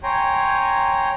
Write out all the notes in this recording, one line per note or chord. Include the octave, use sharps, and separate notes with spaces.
C#5 G5 G#5 A#5 C6